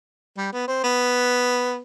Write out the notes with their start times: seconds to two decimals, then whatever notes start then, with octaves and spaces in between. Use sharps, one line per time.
0.37 G3
0.53 B3
0.68 C4
0.84 B3